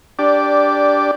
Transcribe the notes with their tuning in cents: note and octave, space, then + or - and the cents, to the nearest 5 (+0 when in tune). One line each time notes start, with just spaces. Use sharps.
D4 -10 G4 +0 D5 +0